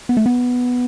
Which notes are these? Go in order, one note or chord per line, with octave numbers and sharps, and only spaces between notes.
B3
A3
B3